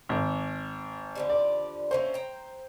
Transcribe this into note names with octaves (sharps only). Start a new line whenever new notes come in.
G#1
D3 F3 G3
D5
A3 A#3 C#4 C5
G5 A#5